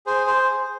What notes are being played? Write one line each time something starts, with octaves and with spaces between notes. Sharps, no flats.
G#4 C5
C5